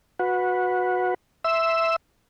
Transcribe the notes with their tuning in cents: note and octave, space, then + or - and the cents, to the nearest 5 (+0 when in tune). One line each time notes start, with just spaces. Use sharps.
F#4 -20 B4 +0
E5 +0 C6 +0 E6 +0